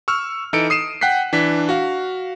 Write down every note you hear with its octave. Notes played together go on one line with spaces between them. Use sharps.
C#6 E6 F6
E3 D#4 A4 C#7 D7
D#6 C7 D#7 E7
F#5 G5 F#6 B6 C7
E3 D4 B6
F#4 F5